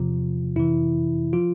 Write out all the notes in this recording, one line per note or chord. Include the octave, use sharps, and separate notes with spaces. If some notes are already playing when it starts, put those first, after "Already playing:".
Already playing: E2 C3 F3 F4
F2 C3 E3 E4
F3 F4